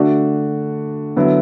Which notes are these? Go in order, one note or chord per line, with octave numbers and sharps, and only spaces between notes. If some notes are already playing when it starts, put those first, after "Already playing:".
Already playing: D3 A3 D4 F#4
D3 F#3 B3 E4